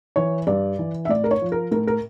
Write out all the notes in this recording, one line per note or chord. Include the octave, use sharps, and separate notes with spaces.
E3 C#5
G2 D5
E3
E5
A2 D5
A#4
C#5
F3
A#4
A2 A#4
A#4